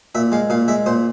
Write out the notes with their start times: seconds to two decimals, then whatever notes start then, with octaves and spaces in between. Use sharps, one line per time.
0.15 A#2 E5
0.32 G#3 F5
0.50 A#2 F5
0.68 G#3 E5
0.86 A#2 C5